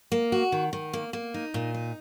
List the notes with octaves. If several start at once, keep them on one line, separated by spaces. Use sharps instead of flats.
A#3
F#4
D#3
D#3
A#3
A#3
D#4
A#2
D#4